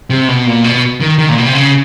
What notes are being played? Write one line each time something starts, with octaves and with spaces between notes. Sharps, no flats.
C3
B2
A#2
B2
D#3
D#3
A#2
B2
C3
C#3